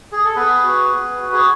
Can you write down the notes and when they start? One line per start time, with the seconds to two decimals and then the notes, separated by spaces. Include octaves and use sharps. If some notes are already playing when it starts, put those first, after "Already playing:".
0.12 G#4
0.25 A4
0.36 B3 G#4 B4
0.64 F#4
0.91 B3
1.19 F#4
1.33 G#4